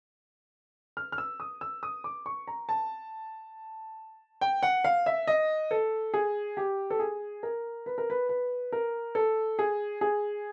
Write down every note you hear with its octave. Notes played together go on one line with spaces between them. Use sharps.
F6
F6
E6
D#6
E6
D#6
D6
C#6
A#5
A5
G5
F#5
F5
E5
D#5
A4
G#4
G4
A4
G#4
A#4
B4
A#4
B4
B4
A#4
A4
G#4
G#4